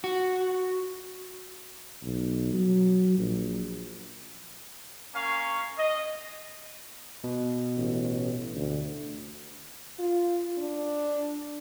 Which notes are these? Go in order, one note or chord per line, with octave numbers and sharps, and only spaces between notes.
F#4
B1
F#3
A#1
A#3 C#4 F5 C#6
D#5
B2
A1
D2
F4
D4